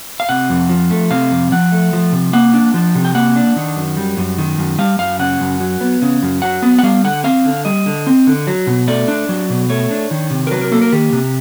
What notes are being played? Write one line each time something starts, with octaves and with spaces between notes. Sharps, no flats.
F5
C3 F#5
F2
F3
A3
C3 F5
F2
F3 F#5
A3
F3
C3
A#3 F#5
D4
F3
C3
G5
A#3 F#5
D4
D#3
F#2
G3
F#2
D#3
F#2
G3 F5
F#2 F5
C#3 F#5
F#2
F#3
B3
C#3
F#2
F#3 F#5
B3
F#5
G3 F5
D3 F#5
C4 F5
D3
G3 D#5
D3
C4
D3
F#3
B2
A3 D5
D4
F#3
B2
A3 C#5
D4
D#3
C3
A#4
F#3 B4
A#4
A#3 A4
A#4
D#3 G4
C3